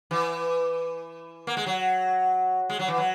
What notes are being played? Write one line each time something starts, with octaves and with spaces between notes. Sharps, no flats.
E3
A#3
G#3
F#3
G#3
F#3
E3
F#3